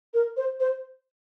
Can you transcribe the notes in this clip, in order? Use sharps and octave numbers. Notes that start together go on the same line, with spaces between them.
A#4
C5
C5